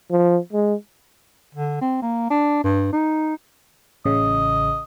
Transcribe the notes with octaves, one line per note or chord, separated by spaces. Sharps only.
F3
G#3
D3
C4
A#3
D4
G2
D#4
A1 C#3 D#5